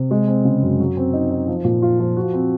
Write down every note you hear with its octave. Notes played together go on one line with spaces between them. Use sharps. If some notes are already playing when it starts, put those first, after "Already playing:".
Already playing: C3
G#3
C4
C#3
F#2
F#3
C4
D#4
D#4
F3
A#2
F4
F3
F#4
C4